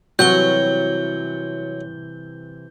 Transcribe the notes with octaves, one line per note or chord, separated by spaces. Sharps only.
C3 E3 F#3 G3 F#4 G6 G7